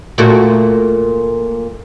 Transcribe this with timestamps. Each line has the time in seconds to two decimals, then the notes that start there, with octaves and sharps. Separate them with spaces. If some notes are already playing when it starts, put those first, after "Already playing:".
0.18 A#2 A3 F#4